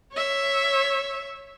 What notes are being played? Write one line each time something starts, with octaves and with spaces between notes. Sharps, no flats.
C#5 E5